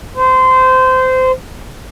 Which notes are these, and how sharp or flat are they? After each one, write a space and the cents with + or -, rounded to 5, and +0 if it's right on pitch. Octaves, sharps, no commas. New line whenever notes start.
C5 -20